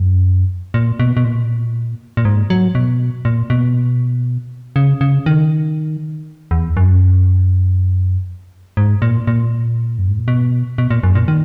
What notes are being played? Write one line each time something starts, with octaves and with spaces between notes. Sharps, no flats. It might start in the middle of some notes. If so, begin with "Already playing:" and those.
Already playing: F#2
A#2
B2
B2
A#2
A#2
G#2
F#3
B2
A#2
B2
C#3
C#3
D#3
E2
F#2
G#2
A#2
A#2
F#2
G#2
A#2
B2
B2
A#2
F#2
A#2
D#3